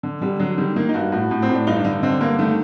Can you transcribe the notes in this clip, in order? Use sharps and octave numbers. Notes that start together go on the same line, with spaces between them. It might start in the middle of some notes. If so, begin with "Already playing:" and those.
D3
D3 G3
D3 F#3
D#3 G3
D#3 A#3
D#4
G2 F#4
A2 F#4
A2
C4
A2
D4
G2 D#4
D4
D3 D#4
D3 C4
G2 A#3
D#3 A3